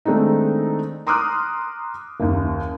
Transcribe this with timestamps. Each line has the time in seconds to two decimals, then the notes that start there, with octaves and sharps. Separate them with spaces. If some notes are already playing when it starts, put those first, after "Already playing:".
0.05 D#3 G#3 A3 C4 D4 D#4
1.07 A#5 C6 D6 D#6 F6 F#6
2.20 F#1 D#2